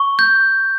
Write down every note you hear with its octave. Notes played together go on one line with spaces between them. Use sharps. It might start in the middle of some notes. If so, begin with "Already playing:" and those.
Already playing: C#6
G6